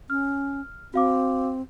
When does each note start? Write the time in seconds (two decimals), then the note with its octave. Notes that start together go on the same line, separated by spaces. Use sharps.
0.10 C#4 F6
0.94 C4 F#4 F5 D6